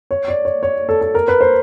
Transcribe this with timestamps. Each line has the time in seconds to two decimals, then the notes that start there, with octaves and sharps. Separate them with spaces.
0.11 C#5
0.28 D5
0.45 C#5
0.63 C#5
0.89 A4
1.01 A4
1.15 A#4
1.28 B4
1.41 C5